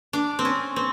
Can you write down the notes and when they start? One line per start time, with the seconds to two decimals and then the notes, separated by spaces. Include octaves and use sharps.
0.13 D4
0.39 C4
0.45 C#4
0.76 C4